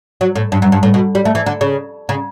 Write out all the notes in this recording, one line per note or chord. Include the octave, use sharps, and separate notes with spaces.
F#3
A2
G2
F#2
G2
A2
B2
G3
A3
E3
D3
C#3
C#3